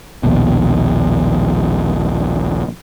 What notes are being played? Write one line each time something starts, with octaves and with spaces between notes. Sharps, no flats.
A#1 D#2 B2